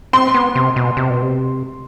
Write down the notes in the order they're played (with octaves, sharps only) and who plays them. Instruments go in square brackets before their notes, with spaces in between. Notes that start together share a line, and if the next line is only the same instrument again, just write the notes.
[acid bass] C4 [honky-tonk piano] C6
[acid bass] B3
C3
B2
C3
B2
C3